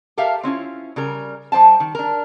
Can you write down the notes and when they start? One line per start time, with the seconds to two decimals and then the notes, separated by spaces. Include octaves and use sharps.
0.17 G4 A4 A#4 E5 F5
0.43 C4 C#4 E4 F4
0.96 C#3 G3 A#4
1.52 G3 C5 G5 A5
1.80 D#3
1.95 D4 A#4